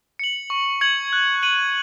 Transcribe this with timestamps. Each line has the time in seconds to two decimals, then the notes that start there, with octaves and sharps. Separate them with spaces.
0.19 C#7 F#7
0.50 C#6
0.81 G#6 C#7 F#7
1.13 F#6
1.43 D#7 F#7